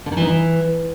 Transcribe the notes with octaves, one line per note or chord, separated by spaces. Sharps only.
D3
D#3
E3
D#4
E3